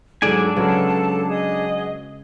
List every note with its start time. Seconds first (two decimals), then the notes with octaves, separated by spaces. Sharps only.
0.22 G#2 F#3 D4 G#4 A4 D5 G#5
0.56 C#3 F#3 G#3 A4 B4 A5
1.29 G#4 D#5 D#6